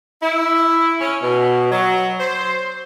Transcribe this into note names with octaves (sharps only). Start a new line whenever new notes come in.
E4
C#4
B2
F#3
C5